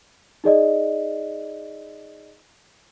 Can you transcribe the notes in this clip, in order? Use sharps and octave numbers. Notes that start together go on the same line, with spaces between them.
D#4 G#4 D5 D#5